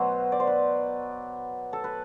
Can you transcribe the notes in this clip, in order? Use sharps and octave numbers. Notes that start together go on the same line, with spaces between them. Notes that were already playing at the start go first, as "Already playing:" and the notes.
Already playing: B2 F#3 C5
D5
C5
B4
A4
B4